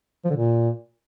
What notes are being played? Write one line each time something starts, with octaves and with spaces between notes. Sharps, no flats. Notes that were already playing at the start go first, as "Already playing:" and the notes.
F3
D3
A#2